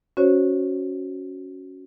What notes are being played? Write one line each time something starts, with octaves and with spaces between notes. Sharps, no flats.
C#4 F#4 C5 C#5